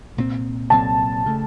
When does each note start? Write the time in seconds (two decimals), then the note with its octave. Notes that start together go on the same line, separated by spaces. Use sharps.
0.17 C2 A#2 F#3 C4
0.70 C2 A#2 F#3 C4 A5
1.26 C#3 A3